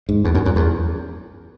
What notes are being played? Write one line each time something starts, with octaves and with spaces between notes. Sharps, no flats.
G#2
E2
F#2
F#2
E2